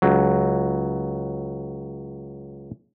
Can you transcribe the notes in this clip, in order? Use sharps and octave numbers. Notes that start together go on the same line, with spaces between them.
C#2 F#3